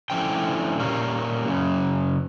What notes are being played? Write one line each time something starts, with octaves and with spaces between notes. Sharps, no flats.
D3 F3 A3 C#4 E4 G5
A#2 G3 A#3 C#4
F#2 C#3